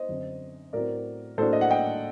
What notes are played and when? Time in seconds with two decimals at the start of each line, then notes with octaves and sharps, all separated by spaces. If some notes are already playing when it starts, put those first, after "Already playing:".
Already playing: C5 D#5
0.09 F#2 D3 F#3 C4
0.73 A2 F#3 C4 A#4 D5
1.38 A2 F#3 A#3 D4 A4 C5
1.53 D#5
1.61 F#5
1.70 D#5 G5